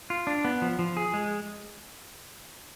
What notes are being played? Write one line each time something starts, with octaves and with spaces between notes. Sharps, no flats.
F4
D4
B3
F3
F3
G#4
G#3